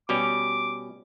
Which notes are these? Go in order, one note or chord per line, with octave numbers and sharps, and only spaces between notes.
B2 G3 C#4 D6